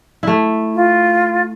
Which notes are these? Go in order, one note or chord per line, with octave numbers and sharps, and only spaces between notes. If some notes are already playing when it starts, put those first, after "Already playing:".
A3 E4
F4